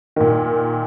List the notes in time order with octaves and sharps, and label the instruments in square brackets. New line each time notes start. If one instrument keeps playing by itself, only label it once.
[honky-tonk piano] A#2 D#3